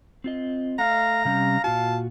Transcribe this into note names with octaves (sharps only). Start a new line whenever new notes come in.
C4 F4 D#5
A3 F5 A#5
C3 G3 C#4 F5
A#2 F4 F#4 A5